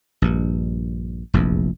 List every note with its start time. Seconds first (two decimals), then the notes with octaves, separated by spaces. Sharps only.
0.22 A#1 G2
1.34 F1 A#1 E2